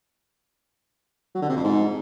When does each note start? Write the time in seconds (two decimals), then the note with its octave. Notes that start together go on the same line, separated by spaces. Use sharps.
1.35 F#3
1.42 D3
1.49 C3
1.56 F2
1.64 G#2